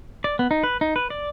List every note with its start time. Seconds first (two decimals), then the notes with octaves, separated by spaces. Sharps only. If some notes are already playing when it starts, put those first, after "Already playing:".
0.24 D5
0.39 B3
0.51 D#4
0.64 B4
0.81 D#4
0.96 B4
1.10 D5